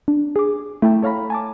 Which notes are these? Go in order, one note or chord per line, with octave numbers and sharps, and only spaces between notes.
D4
G#4 D6
A3 E4 A4 G5 A5
A4 C#5 F5 A#5 B5
G#5 A5 D6